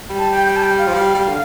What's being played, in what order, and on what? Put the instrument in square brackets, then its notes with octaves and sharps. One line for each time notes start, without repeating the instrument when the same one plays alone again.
[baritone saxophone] G3
[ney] A5
G5
G5
A5
G5
F5
[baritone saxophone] F3
[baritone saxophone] G3 [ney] F5
[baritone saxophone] G3
D3